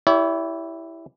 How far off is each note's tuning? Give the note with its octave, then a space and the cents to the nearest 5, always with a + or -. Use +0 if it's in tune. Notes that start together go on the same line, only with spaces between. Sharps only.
E4 +0 G4 +0 C#5 +45